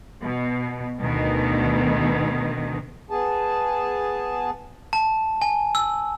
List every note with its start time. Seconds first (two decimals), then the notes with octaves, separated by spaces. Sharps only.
0.23 B2
1.01 D2 B2 D#3
3.10 B3 G#4 A5
4.93 A5
5.42 G#5
5.75 E6